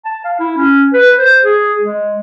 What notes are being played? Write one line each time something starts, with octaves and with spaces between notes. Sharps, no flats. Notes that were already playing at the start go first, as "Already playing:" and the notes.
A5
F5
E4
C#4
B4
C5
G#4
G#3